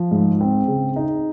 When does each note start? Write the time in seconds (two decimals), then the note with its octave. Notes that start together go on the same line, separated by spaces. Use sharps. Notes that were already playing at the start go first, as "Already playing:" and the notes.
Already playing: F3
0.11 G#2
0.41 C4
0.68 C#3
0.96 D#4